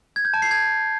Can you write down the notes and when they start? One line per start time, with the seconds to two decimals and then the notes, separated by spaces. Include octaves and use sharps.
0.16 G#6
0.25 G6
0.34 A5
0.42 C7
0.51 G#6